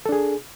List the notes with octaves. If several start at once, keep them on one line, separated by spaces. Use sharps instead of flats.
D4 G#4 A4